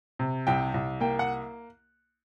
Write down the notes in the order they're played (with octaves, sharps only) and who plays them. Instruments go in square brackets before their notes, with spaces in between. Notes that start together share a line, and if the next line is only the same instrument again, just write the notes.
[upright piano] C3
C2 G5
C2
A#3 G5
F#5